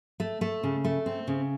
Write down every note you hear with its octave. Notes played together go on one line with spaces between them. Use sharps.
A3
A3
C#3
A3
C4
C#3